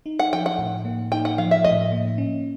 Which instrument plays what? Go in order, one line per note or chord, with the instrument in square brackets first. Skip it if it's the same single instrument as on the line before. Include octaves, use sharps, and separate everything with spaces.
[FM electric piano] D#4
[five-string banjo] F#5
[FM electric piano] F3 [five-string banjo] G5
[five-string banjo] F#5
[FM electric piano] A2
A#3
[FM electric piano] D#4 [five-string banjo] G5
[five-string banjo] F#5
[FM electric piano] F3 [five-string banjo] F5
[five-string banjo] E5
[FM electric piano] A2 [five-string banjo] D#5
[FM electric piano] A#3
C#4